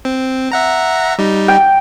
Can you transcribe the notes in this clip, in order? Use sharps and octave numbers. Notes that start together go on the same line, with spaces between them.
C4
E5 F#5 A#5
G3 D#4
G5